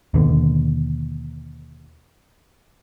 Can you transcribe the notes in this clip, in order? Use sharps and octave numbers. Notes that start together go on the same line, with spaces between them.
D#2 B2 D3